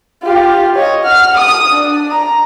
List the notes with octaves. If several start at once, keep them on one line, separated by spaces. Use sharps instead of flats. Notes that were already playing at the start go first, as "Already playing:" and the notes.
F4 G4
C#5 D#5
F#5 F6
D#6
D4
A#5